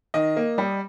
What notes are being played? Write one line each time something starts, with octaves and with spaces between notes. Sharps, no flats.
D#3 D#5
A#3
G3